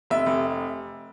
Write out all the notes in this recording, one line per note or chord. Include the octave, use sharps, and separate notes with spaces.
F1 E5
F1